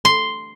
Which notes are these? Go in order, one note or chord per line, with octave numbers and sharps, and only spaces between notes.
C6